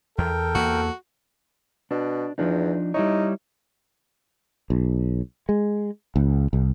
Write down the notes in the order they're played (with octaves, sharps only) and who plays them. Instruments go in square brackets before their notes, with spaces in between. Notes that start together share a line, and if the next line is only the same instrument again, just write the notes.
[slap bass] E2 [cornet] A4 [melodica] A#4 G5
[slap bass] E2 A#3 [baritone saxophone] F#4
[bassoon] B2 [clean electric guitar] D4
[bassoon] E2 [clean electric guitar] F3 D4 D#4
[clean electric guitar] G3 E4 C#5 [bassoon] D#4
[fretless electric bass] B1
G#3
C#2
C2